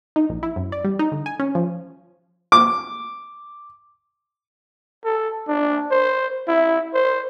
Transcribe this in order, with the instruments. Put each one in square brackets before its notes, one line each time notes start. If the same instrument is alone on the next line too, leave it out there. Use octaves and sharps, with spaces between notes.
[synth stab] D#4
A#1
E4
F#2
D5
G3
D#4
D3
G#5
C#4
F3
[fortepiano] D6
[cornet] A4
D4
C5
E4
C5